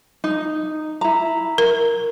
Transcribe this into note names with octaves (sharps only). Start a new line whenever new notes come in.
D#4
E4 A#5
A#4